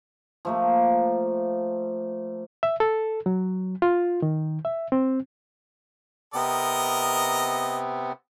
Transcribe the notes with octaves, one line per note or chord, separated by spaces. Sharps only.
F3 A3 A#3
E5
A4
F#3
F4
D#3
E5
C4
C3 B3 C4 A#4 D#5